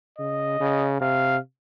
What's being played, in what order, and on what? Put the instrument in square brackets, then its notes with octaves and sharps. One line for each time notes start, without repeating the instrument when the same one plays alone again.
[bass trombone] C#3 [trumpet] D#5
[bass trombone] C#3
[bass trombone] C3 [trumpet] F5